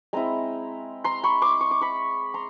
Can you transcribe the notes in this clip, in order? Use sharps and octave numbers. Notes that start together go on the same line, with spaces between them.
G#3 C4 E4 G#5 A#5
A#5 C6
B5 C#6
C6 D6
C#6
D6
B5 C#6
A#5 C6